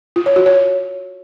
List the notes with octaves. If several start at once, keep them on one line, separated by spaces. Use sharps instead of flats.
F4
C#5
F#4
C#5